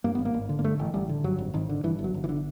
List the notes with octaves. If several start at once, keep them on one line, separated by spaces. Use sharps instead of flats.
G2 A#3
G#1 B3
A#3
G#1
D3
A#3
G2 A3
A1
A1 G3
D3
G2 F#3
G#1
G#1 D#3
D3
G2 E3
G1
F#3
G1
E3
D3